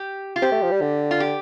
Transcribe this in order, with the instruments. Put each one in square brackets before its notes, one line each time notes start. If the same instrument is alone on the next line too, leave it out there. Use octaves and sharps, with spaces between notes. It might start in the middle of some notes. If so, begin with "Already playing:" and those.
Already playing: [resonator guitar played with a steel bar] G4
F4
[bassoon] C4 [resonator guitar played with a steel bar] G4
[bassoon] A3
F3
G3
D3
[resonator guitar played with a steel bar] F4
G4